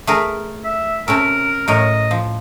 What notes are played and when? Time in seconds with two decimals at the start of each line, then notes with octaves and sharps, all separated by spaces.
0.07 A3 G#4 A#4
0.64 E5
1.08 C3 C#4 A4 A#4
1.68 A2 A#4 C#5 D#5
2.11 F3